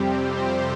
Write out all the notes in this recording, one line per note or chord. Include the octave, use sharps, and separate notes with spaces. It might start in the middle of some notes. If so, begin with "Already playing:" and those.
Already playing: F2 C3 G3 C4 G4
C5